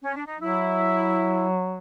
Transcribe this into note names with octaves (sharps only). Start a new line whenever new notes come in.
C#4
D4
D#4
F#3 E4